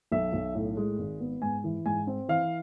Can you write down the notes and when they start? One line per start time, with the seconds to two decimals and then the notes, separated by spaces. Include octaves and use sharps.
0.12 B1 E5
0.33 B1
0.55 A2
0.77 G#3
0.98 G#1
1.20 B3
1.42 G#2 G#5
1.64 E3
1.85 G#2 G#5
2.07 C4
2.28 E3 F5